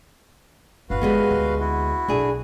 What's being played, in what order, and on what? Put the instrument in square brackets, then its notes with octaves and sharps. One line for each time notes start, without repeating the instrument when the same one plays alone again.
[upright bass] G1 D4 [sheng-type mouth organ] F#4 B4 F5
[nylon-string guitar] G3 G#3 B3
[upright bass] D2
[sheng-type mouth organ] E4 F#4
[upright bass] B1 [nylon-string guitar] D4 G#4